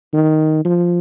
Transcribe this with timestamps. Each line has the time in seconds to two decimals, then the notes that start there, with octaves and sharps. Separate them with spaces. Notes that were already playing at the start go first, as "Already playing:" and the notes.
0.13 D#3
0.65 F3